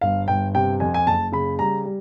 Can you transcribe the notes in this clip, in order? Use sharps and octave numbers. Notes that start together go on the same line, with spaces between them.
G1 F5
G1 G5
C3 G5
F2 G#5
G#5
F#1 A5
C#3 B5
G3 A#5
G3